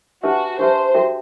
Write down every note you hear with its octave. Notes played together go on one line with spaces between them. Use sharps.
D4 F#4 G4 B4 E5 A5
D4 G4 B4 C5 E5 A5
F#4 A4 E5 G5